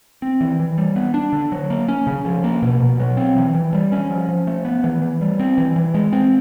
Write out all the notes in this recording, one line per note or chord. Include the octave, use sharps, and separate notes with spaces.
C4
E3
E3
G3
B3
D4
D3
F#3
A#3
C#4
C#3
F3
A#3
B2
B2
F#3
C4
E3
E3
G3
C#4
F3
F3
A3
B3
E3
E3
G3
C4
E3
E3
G#3
C4